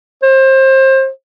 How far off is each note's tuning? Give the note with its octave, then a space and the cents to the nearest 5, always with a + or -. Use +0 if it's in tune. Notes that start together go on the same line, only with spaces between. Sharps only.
C5 +30